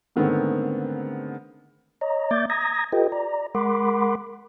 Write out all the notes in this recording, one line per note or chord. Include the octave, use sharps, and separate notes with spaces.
G#2 D3 D#3 A3 B3 C4
C#5 D#5 A#5
A#3 D5 E5 D6 G6 A6
A#5 D#6 G#6 A#6
F4 G4 A4 B4 D#5 G5
D5 A#5
G#3 A#4 F#5 B5 C6 D6